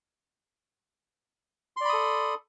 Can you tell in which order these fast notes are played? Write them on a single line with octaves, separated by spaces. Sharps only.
C6 D5 B5 D#6 A4